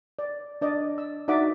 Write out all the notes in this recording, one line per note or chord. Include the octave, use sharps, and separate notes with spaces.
D5
D4 D5 D#5
E6
D#4 F#4 D5 E5 F#5 D6